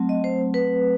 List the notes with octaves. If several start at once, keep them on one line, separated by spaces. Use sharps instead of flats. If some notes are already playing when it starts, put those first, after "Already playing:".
Already playing: F#3 A3 C4
D#5
C5
B4